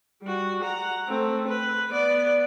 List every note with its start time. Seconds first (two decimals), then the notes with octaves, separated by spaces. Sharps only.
0.22 G3 F#4
0.63 F#5 A#5
1.08 A3 C4
1.48 B4
1.91 B3 D5